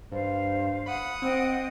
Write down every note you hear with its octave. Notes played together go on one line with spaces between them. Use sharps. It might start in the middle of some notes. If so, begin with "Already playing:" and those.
G2 C5 F5
F#5 B5 D#6
C4 C5 D#5 G5